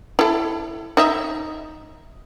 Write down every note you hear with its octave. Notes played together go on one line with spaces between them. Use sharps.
E4 A4
D#4 D#5 E5